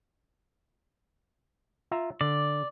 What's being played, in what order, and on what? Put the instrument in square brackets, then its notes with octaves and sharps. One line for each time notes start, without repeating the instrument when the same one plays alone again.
[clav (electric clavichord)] F4 E5 A#5
[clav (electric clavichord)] D3 [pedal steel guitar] D5